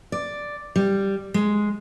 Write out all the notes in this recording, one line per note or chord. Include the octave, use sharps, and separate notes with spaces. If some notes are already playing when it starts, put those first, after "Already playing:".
D5
G3
G#3